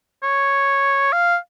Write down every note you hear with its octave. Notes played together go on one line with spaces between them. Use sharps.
C#5
F5